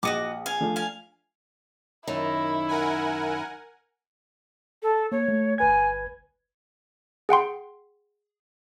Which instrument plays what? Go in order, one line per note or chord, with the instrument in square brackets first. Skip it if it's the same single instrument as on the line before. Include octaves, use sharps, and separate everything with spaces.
[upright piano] A#1 C#7 [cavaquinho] F#4 D#5 D6
[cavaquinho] F5 G#5
[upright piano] F3 A3 D4
[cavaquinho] F5 G#5
[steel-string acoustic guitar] F#2 D#3 D#4 [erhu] E4
[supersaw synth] A#4 F#5 G#5
[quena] A4
[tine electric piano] A#3 [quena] C#5
[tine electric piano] A3
[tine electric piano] G1 B4 G#6 [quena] G#5
[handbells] G#4 F#5 G5 C6